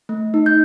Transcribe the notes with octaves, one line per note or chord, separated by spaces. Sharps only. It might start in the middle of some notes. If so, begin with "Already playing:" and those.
A3
D#4
G6